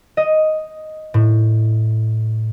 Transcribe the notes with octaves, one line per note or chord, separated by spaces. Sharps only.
D#5
A2